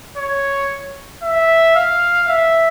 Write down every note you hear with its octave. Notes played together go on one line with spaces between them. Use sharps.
C#5
E5
F5
E5